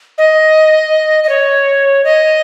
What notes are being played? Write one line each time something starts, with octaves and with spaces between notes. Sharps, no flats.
D#5
D#5
C#5
D#5